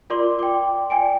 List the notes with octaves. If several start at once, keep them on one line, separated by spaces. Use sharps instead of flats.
F4 A#4 D5 C6 D6
G5 D6
D5 G5 G#5 D7